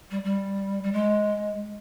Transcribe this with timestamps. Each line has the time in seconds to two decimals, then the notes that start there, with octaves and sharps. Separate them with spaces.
0.11 G3
0.24 G3
0.83 G3
0.92 G#3